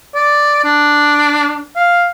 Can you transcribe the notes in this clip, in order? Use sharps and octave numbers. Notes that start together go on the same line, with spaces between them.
D5
D4
F5